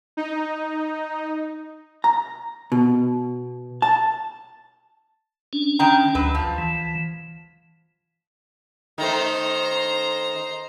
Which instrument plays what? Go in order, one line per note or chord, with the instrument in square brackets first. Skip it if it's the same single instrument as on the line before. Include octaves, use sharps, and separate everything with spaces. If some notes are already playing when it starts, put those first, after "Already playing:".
[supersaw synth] D#4
[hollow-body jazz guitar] A#5
B2
A5
[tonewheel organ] C#4 D4
[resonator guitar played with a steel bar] D#3 G5 A#5
[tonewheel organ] D2 [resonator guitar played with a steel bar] F#3 B4
[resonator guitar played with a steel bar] F3
[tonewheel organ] E3
[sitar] D#3 A3 [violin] C5 A#5